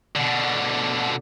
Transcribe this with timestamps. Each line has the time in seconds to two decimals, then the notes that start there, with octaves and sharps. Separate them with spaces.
0.16 B2 D3